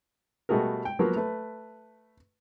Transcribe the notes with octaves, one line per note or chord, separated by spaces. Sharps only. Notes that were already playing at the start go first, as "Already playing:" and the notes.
B2 G3 A3 F#4 G#4 A#4
G5
F3 F#3 A#3 B3 F#4
A3 B4